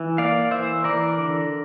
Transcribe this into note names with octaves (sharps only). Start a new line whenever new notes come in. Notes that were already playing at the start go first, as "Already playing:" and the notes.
Already playing: E3
A#3 D5 F5
E3 C5 E5
E3 A#4 D5
D3